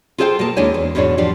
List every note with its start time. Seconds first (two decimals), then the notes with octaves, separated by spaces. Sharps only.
0.18 F4 G#4 A4 C5 F#5 G5
0.39 B2 A#3 G#4 A4 A5
0.57 D#2 G#3 D4 E4 C#5 G#5
0.74 E2
0.95 E2 G#2 B2 D4 C#5
1.18 E2 F3 D4 G4